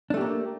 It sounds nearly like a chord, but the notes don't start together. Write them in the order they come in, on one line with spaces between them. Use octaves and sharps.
D4 A3 G4 A#3